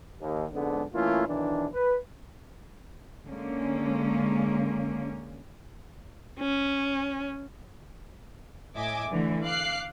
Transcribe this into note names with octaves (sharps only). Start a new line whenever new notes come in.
D#2
F2 G#2 D3 G#3 B3 D4
E3 A3 A#3 C#4 E4 F4
B1 D#3 E3 D4
B4
D3 G#3 A#3 C#4
C#4
A2 D#5 E5 G#5 D6
D3 E3 A3
F5 D6 F#6 C7